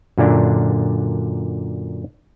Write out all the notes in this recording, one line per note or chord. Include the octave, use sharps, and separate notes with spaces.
F#2 A#2 D3 D4